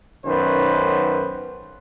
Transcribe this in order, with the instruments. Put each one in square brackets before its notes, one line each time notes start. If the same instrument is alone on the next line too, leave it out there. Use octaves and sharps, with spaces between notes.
[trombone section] B1 F#2 D#3 C#4 B4 C5